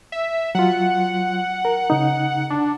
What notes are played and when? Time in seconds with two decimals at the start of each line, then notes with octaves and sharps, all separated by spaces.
0.12 E5
0.55 F#3 F4 F#5
1.65 A#4
1.90 C#3 D#4
2.50 D4